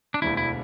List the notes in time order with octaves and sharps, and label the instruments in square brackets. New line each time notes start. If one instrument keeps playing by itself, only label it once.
[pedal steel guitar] D4
[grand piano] E1 D2 D3 [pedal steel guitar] E4
[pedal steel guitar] E4